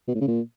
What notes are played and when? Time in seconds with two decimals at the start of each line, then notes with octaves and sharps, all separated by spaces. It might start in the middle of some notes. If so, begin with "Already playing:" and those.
0.08 B2
0.15 A2
0.21 C#3
0.28 A#2